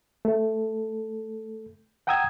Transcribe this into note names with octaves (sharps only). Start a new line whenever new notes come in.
A3 A4
F#5 G5 A#5 D#6 E6 G#6